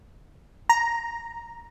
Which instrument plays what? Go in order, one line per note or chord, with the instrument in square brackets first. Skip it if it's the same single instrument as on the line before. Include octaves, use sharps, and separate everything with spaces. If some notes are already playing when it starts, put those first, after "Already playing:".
[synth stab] A#5